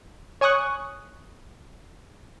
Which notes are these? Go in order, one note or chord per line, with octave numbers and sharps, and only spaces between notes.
C#5 G#5 C#6 D#6 F#6